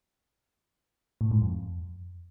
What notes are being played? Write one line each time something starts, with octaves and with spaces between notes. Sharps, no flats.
A2
G#2
F2